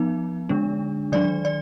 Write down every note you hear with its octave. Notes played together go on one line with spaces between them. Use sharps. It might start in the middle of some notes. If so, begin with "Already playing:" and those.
Already playing: F3 B3 D#4
D3 G#3 D4
D#3 F#3 D4 D5
D5